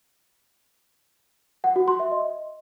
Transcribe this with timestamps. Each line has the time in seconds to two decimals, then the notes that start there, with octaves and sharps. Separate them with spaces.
1.64 F#5
1.76 F#4
1.88 C6
2.00 E5
2.11 D#5